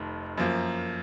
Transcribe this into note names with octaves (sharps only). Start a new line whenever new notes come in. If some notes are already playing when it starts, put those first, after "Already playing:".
Already playing: F1 F2 D#3
F#2 F3 A#3